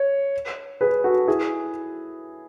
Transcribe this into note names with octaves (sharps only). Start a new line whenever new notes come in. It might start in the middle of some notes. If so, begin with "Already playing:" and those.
Already playing: C#5
G#4 B4
F#4 A4
E4 G#4